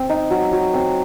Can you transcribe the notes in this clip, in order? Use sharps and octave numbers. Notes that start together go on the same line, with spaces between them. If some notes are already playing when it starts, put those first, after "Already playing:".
Already playing: C4
D#4
F#3
F#3
C4